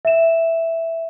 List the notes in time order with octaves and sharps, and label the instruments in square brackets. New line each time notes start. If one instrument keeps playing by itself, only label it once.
[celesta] E5 E7